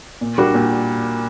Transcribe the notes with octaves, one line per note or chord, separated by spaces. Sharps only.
A#2
G3 A#3 D4 F#4
A#2